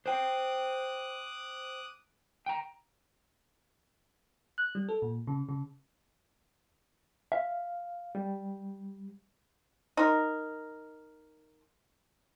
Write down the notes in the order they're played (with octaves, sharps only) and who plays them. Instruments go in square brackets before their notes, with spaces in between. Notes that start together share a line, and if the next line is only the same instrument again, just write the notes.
[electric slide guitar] C5 G5 [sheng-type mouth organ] D6 D#6 F#6
[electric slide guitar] G5 A#5
[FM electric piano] F#6
G3
A4
A#2
C#3
C#3
[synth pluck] E5 [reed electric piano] F5
[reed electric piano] G3
[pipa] D#4 A#4